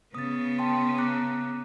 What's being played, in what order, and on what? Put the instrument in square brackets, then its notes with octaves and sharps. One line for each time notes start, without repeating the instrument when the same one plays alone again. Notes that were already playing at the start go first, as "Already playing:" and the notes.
[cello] C#3 B3 [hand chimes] D#6 A6
[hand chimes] G5 A5 C6
A#5 D6 F#6